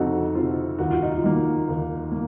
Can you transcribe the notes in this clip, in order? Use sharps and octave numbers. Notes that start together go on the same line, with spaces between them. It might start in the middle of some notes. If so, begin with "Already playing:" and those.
Already playing: F2 C3 D#4 F#4 A4
C3 F3 F4
D#2 F#4
F4
D#4
F4
D#3 A#3
D#2
A#3